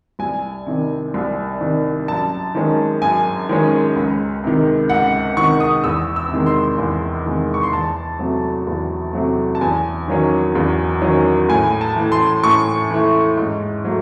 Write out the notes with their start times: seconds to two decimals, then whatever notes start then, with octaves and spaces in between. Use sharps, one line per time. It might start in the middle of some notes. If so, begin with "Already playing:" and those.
0.19 C2 G#5
0.66 C3 D#3
1.14 C2
1.61 C3 D#3
2.08 F#2 A5
2.55 D#3 G#3 C#4
3.02 F#2 G#5
3.49 D#3 G#3 C#4
3.96 C#2
4.44 C3 D#3
4.90 C#2 F#5
5.37 C3 D#3 C#6
5.60 D#6
5.84 E2 E6
6.16 E6
6.31 C3 D#3 G#3
6.46 C6
6.78 E2
7.26 C3 D#3 G#3
7.54 C#6
7.63 C6
7.72 E2 A5
8.19 C3 F#3 A3
8.67 E2
9.13 C3 F#3 A3
9.55 A5
9.61 E2 G#5
10.08 D#3 F#3 C#4
10.55 E2
11.02 D#3 F#3 C#4
11.49 A2 G#5
11.81 A5
11.96 E3 A3
12.12 C6
12.43 A2 C#6
12.91 E3 A3
13.37 G#2
13.84 F#3 A3